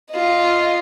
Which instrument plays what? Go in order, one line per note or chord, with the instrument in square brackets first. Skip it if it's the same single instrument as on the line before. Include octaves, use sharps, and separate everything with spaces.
[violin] F4 D#5